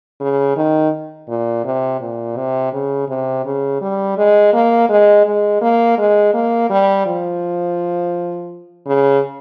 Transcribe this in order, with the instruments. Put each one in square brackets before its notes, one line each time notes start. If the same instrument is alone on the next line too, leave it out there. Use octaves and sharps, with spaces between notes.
[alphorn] C#3
D#3
A#2
C3
A#2
C3
C#3
C3
C#3
G3
G#3
A#3
G#3
G#3
A#3
G#3
A#3
G3
F3
C#3